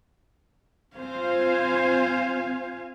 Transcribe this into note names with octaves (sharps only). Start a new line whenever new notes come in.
C4 F4 C5 F5 G#5